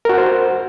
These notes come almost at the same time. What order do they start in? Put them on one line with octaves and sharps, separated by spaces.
A#4 F#4 F#5 C5